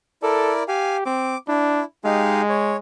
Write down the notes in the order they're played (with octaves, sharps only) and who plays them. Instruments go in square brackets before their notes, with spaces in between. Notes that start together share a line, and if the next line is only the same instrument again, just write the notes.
[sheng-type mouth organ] E4 A#4 D5 [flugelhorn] A4
[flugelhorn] G4 [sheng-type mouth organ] F5 G#5
[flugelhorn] C4 [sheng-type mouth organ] D6
[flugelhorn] D4 [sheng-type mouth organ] E4
[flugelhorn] G#3 [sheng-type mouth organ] D#4 G4 F5
[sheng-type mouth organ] C#5